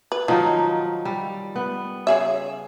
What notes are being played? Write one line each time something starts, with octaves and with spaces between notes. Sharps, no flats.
B4
D#3 F3 F#3 D#4
G3
B3
C#3 G#4 E5